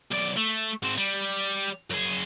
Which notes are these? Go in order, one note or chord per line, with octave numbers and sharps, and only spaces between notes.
B1 D5
A3
G#2 C4
G3
F#2 G#4